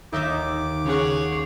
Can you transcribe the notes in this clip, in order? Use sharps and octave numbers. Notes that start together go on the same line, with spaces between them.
D#2 D#4 D#5 E5 D6
C#3 C#4 G#4 C#5 F#5